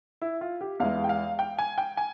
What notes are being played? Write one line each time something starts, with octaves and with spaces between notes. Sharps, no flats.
E4
F4
G4
E2 E3 G#3 F5
G5
F5
G5
G#5
G5
G#5